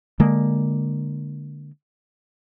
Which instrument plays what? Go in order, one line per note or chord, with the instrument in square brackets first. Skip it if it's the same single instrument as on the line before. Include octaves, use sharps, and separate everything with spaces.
[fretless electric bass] D3 G#3 A#3